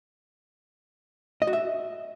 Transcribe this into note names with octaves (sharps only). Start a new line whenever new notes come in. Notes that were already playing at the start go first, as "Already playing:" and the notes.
D#5
F#4
E5